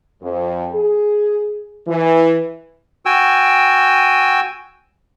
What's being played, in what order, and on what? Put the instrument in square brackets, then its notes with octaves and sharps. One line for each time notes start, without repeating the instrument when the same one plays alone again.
[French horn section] F2
G#4
E3
[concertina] F#4 G5 G#5 E6